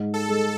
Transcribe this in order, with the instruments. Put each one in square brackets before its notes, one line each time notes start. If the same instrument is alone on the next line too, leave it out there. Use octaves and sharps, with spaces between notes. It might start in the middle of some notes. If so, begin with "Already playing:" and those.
Already playing: [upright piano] G#2
[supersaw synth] A4
[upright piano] G#3